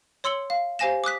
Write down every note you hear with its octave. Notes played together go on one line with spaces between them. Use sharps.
C#5 C6 E6 C#7 F#7 G7
F5
G4 C5 F5 G#5 A#6 E7
D6 D#6 F#6 B6